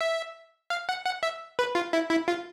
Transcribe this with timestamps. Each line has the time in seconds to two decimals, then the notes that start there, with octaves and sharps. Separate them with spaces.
0.01 E5
0.70 F5
0.89 F#5
1.05 F#5
1.23 E5
1.59 B4
1.75 F4
1.93 E4
2.10 E4
2.28 F4